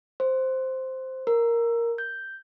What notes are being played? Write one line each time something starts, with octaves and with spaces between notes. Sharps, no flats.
C5
A#4
G6